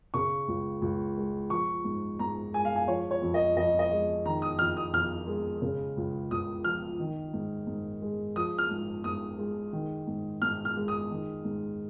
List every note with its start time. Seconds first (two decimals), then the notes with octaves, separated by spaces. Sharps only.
0.14 C#3 C#6
0.48 C#2
0.82 C#2
1.17 G#3
1.50 F3 C#6
1.84 G#2
2.19 G#2 A#5
2.53 G#3 G#5
2.65 F5
2.76 G#5
2.87 F3 C#5
3.11 C#5
3.22 F2
3.34 D#5
3.56 F2 D#5
3.79 D#5
3.91 G#3
4.26 D#3 A#5
4.42 D#6
4.59 F2 F6
4.77 D#6
4.93 F2 F6
5.27 G#3
5.62 C#3
5.97 C#2
6.31 C#2 D#6
6.64 F3 F6
7.00 D#3
7.33 G#2
7.67 G#2
8.02 G#3
8.36 F3 D#6
8.58 F6
8.70 G#2
9.04 G#2 D#6
9.38 G#3
9.73 D#3
10.07 G#2
10.42 G#2 F6
10.65 F6
10.77 G#3
10.88 D#6
11.11 D#3
11.45 G#2